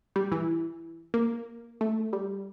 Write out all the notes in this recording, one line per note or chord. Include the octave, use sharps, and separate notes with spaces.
G3
E3
A#3
A3
G3